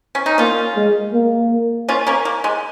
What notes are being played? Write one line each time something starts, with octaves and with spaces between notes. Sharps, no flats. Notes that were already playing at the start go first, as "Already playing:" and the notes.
C#4
D#4
A#3 C#4 F4
G#3
A#3
C#4 F4
A#3 C#4
A#3
G#3